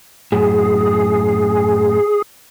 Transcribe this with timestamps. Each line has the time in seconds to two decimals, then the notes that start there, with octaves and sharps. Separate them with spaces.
0.32 F#2 A2 G#4